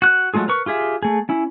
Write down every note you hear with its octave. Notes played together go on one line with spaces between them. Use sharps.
F#4 F#6
F#3 G#3 A3 F4 G#4
A#4 B4 C#6
F4 G4 G#4 E5
A3 G#4
C#4 E4